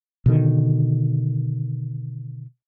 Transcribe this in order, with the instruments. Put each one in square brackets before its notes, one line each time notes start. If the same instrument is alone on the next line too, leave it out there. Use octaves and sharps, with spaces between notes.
[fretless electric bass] B2 D3 D#3